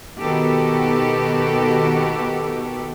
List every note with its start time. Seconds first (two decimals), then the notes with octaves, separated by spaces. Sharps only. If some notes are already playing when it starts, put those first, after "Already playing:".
0.20 B2 D#3 B3 F#4 G4 A4